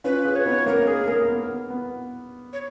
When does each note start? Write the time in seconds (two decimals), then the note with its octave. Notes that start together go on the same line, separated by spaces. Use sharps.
0.04 C#4 F4 B4
0.25 F4 G#4
0.35 C#5
0.46 B3 D#4
0.66 A#3 C#4 A#4
0.87 G#4
1.08 A#3 A#4
1.28 B3
1.49 B3
1.70 B3
2.53 C#5